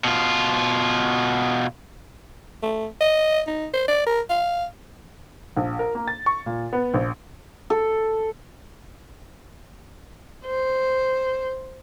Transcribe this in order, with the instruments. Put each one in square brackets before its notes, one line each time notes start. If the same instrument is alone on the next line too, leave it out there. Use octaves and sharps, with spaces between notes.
[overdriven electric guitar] B2 F4
[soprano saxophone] A3
D#5
D#4
C5
D5
A#4
F5
[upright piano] A#1
A#4
A#3
A6
C#6
A#2
B3
A#1
[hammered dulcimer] A4
[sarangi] C5